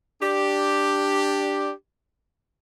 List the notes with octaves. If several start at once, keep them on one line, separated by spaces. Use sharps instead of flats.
D4 G4